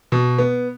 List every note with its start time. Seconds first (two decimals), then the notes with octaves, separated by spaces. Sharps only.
0.12 B2
0.38 B3